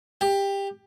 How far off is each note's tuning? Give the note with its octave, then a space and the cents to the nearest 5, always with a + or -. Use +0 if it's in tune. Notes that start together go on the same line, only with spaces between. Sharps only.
G4 +15